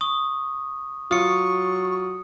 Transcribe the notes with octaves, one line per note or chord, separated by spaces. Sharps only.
C#6 D#6
F#3 F4 C#6 D#6 C#7